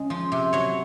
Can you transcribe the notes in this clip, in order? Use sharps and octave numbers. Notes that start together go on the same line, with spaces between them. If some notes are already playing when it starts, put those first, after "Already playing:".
Already playing: C#3 G#3
F3
C3
F#3 C#5